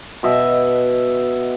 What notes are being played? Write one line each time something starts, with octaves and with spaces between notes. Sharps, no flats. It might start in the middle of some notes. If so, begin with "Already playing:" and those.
B2 D#5 E5